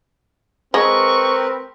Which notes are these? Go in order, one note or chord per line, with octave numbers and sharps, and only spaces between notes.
G#3 C4 A#4 B4 C#6